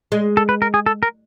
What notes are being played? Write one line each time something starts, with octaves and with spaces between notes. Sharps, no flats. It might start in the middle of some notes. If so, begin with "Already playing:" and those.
G#3
A4
B4
A#4
G#4
A4
A#4